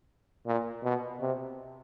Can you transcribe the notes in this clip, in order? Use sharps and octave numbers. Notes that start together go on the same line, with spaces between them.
A#2
B2
C3